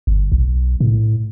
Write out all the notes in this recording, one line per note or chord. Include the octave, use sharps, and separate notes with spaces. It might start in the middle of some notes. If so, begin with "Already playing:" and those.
G1
B1
A2